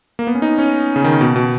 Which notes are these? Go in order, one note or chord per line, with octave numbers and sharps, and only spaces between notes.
A#3
B3
C#4
D#4
C#4
C#3
D#3
B2
B2